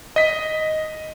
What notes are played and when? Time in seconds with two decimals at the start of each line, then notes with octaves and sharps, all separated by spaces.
0.16 D#5 B6